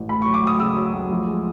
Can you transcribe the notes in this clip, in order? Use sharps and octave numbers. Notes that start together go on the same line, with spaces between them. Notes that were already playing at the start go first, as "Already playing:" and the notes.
Already playing: A1
D2 B5
C#6
F#3
D6
D2 D#6
C#3 E6
F#3
D2
F3
G#3